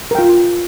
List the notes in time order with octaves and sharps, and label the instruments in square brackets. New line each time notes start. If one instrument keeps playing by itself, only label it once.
[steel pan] A#4
G5
F4